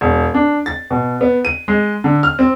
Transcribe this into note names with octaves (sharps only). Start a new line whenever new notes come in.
E1
D4
A6
B2
B3
D#7
G#3
D3
F6
C4